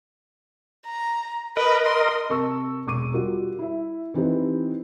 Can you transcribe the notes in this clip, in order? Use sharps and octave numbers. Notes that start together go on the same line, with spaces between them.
A#5
A#4 B4 D#5
C6
C3 A#4 A5 C#6 E6
E1 C#6 D6 D#7
G3 F4 F#4 A#4
E4 E5
E3 C4 D#4 G4 B4